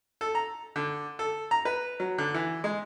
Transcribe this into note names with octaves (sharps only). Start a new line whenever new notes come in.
A4
A#5
D3
A4
A#5
B4
F#3
D3
E3
G#3